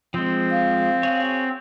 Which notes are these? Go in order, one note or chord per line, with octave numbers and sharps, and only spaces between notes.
F3 G#3 C4
F5
F#4 G#4 C#5